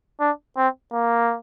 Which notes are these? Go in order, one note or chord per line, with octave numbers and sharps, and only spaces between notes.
D4
C4
A#3